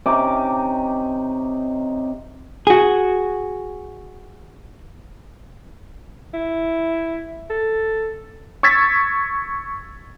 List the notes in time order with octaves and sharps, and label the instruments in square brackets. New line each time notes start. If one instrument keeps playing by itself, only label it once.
[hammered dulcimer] C3 C#4 D#4 D6
[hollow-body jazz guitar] F#4 G#4
[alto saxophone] E4
A4
[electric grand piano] C#6 E6 G#6 A6 B6